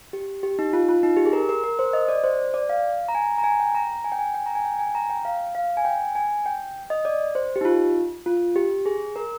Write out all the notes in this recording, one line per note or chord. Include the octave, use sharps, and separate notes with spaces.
G4
G4
D#4
F4
F4
D#4
G4
G#4
A#4
A#4
A#4
C5
D#5
D5
C5
D5
F5
A#5
G#5
A#5
G#5
G5
A#5
G#5
G5
G#5
G5
A#5
G#5
G5
G#5
A#5
G5
F5
F5
G#5
G5
G#5
G5
D#5
D5
C5
G4
D#4
F4
F4
G4
G#4
A#4